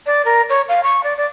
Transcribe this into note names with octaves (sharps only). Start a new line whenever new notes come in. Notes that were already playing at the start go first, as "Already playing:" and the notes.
D5
A#4
C#5
F5
C#6
D5
D5